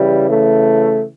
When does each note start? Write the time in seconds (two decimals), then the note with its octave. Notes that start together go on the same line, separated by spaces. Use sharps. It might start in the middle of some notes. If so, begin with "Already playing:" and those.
Already playing: C#3 E3 G3
0.28 A3